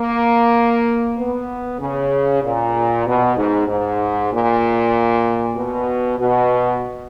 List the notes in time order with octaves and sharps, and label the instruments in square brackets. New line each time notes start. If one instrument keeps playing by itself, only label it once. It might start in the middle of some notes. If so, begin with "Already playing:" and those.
Already playing: [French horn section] A#3
B3
C#3
A#2
B2
G#2
G#2
A#2
B2
B2